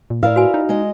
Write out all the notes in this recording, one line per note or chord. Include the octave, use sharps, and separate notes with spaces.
A#2
A2 E4 A#4 D5 F5
F#4 B4 G#5
D#4
G#3 D#5